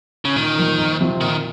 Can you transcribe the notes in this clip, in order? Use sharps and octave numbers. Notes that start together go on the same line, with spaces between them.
C#3
A#2 D#3
F3 A#3
F2
C3 F3 C4
A#2 D#3